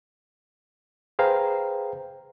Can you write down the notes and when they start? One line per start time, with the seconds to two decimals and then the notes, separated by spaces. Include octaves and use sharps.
1.19 G#4 B4 C5 F5 G5 A#5